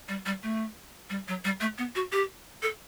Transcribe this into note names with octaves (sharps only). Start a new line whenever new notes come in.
G3
G3
A3
G3
F#3
G3
A3
B3
F#4
G4
A4